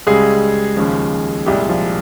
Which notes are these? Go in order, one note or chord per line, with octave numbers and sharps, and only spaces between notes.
C#2 C#3 G3 G#3 G#4
D#2 C#3 F3 G#3
C2 A#2 G3 G#3 G4
F3 F4